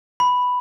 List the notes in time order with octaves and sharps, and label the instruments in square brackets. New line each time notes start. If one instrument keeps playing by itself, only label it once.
[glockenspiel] B5